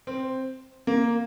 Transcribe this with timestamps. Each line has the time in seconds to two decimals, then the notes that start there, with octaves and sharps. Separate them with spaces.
0.07 C4
0.87 A#3